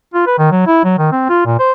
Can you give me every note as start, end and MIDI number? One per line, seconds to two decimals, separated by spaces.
0.14 0.25 65
0.27 0.37 71
0.39 0.48 51
0.52 0.64 54
0.67 0.80 64
0.85 0.98 54
0.98 1.09 51
1.12 1.25 60
1.29 1.41 65
1.46 1.57 46
1.59 1.72 72